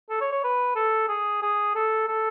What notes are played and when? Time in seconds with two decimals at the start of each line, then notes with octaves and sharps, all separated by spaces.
0.10 A4
0.21 C#5
0.32 C#5
0.44 B4
0.75 A4
1.08 G#4
1.42 G#4
1.75 A4
2.08 A4